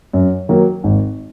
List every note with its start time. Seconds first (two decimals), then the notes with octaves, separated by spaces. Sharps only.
0.13 F#2
0.49 D#3 F#3 A#3
0.84 G#1